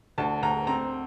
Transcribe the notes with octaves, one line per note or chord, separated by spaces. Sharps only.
D2 A5
D2 A#5
C4 A#5